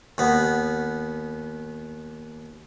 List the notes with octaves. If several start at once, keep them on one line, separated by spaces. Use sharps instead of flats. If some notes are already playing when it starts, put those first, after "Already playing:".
D#2 B3